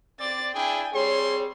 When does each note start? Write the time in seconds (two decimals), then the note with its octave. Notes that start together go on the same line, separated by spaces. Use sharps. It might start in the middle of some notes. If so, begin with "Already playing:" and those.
0.20 C4 D5 A6
0.54 D4 E4 G#4 G5 G#5
0.94 G3 C4 G#4 C#5 C6